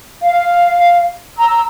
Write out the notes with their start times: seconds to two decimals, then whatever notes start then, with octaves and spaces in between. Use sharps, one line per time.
0.22 F5
1.38 A#5 E6